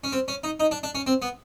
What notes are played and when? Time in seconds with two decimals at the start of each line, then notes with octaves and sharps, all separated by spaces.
0.04 C#4
0.13 C4
0.28 C#4
0.44 D#4
0.60 D#4
0.71 D4
0.83 D4
0.95 C#4
1.07 C4
1.22 B3